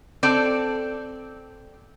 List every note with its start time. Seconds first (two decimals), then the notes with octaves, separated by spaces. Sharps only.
0.23 C4 A4 D5